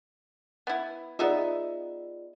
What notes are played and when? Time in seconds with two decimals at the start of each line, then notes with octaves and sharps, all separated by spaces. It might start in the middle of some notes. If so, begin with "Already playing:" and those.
0.67 B3 E4
1.19 B3 D#4 F4 G#4 D5 E5